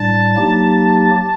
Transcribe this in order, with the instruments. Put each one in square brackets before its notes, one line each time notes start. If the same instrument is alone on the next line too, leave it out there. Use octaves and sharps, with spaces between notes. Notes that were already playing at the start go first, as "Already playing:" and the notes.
Already playing: [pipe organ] A2 G3 D4 [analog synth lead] A5
[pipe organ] F#3 A#3 D#4 G4